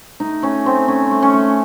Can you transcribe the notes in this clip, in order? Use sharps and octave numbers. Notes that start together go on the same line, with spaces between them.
A3 D#4
A3 C#4
A3 C4
A3 C#4
A3
C#4
A3